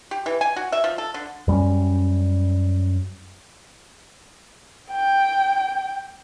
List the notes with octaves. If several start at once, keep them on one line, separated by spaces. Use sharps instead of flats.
G4
E3
G#5
F#4
E5
F3
A4
D3
F#2 G3 B3 C#4
G5